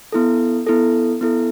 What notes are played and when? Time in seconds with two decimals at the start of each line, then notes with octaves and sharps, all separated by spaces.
0.12 B3 E4 A4
0.67 B3 E4 A4
1.21 B3 E4 A4